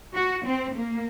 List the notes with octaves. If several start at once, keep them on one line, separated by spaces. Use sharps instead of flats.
F#4
C4
A#3